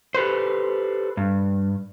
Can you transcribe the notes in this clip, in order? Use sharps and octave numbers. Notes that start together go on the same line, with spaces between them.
G4 A4 B4 C5
G2